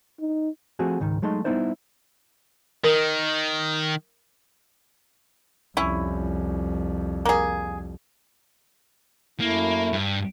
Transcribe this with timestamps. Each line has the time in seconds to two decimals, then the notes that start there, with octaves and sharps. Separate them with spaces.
0.20 D#4
0.79 F3 A3 C4 F#4 G#4
1.00 C#2 G#2 D#3
1.22 F#3 G#3 A3 D#4 C6
1.44 G3 B3 D#4 E4 C5 D5
2.84 D#3 A#4
5.77 C2 F2 C#4 E4
7.25 A#3 G#4
9.40 F#2 A3 A#3 E4
9.93 G2